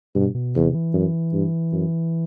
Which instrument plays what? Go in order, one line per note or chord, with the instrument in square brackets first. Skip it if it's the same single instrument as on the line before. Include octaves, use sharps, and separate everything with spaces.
[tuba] G2 [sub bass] B2
[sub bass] B2
[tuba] E2 [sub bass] C3
[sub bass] E3
[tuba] F#2
G2
F#2